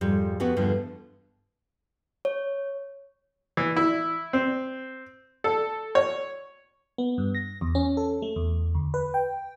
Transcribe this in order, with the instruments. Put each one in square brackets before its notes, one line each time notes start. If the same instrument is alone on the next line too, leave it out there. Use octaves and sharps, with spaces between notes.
[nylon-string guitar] F2 G#2 G3
F2 A3 B3 F#4 G4
E2 G2 D3 F3
[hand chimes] C#5
[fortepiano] E3
E4
C4
A4
C#5
[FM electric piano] B3
G2
A#6
E2
C#4
A4
A3
E2
D2
B4
G5